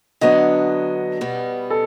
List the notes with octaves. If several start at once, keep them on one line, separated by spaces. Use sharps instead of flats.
D3 F#3 B3 D4 D#5
B2 G3 B3
A4